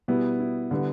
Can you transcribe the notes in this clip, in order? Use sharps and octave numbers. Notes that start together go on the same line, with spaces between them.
B2 G3 B3 E4
E4
D3 G3 B3